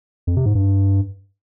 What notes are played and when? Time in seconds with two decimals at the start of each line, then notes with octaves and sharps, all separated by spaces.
0.27 F2
0.36 C3
0.46 G#2
0.55 G2